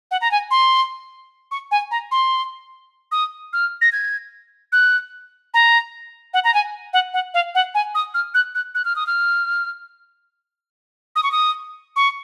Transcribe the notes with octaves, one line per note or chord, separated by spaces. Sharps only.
F#5
A#5
G#5
C6
C#6
G#5
A#5
C6
D#6
F6
A#6
G#6
F#6
A#5
F#5
A#5
G#5
F#5
F#5
F5
F#5
G#5
D#6
F6
F#6
F#6
F#6
F6
D#6
F6
D#6
C#6
D#6
C#6